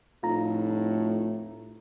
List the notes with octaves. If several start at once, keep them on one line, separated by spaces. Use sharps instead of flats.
F1 A2 F4 A#5